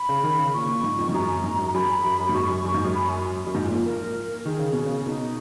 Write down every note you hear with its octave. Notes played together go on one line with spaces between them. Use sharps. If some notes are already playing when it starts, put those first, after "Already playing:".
Already playing: B5
C#3
D#3
C#3
A#2 C#6
A#2
G#2
F2
G#2
F#2 A#5
G#2
F#2
F#2 B5
F#2
F#2
F#2
G#2
F#2 C#6
F#2
F#2
G#2
F#2
B5
G#5
F#2
G#2
A#2
F3
A#4
D#3 G#4
C#3
B2
C#3
B2 D#4